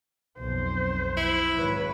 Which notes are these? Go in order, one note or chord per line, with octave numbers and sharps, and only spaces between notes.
B1 F2 C5
E4
G#1 F#3 B4 C#5